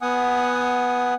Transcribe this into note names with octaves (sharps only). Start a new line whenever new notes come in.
B3 F#5 G#5 D#6